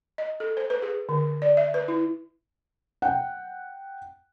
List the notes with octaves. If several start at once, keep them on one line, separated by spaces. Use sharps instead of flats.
D#5
A4
C5
B4
G#4
D3
D5
E5
B4
E4
F#5 G5